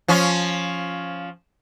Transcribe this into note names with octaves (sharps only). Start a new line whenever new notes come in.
F3 C#4